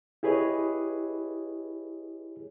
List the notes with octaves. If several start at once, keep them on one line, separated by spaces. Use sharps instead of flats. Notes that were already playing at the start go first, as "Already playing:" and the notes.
E4 G4 G#4 B4 C#5 D#5